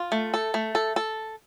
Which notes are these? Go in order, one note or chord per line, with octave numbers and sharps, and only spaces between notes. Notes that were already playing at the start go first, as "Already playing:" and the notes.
Already playing: F4
A3
A4
A3
A4
A4